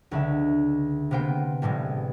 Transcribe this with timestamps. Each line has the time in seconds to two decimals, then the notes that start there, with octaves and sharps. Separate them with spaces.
0.11 C#2 D3 E5
1.11 C3 A#3 B3 C5 G5
1.62 A1 A2 G3 G#3